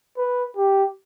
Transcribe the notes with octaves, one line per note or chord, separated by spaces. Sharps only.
B4
G4